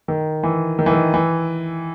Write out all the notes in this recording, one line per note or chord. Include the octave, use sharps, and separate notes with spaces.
D#3
E3
D#3
E3
D#3
E3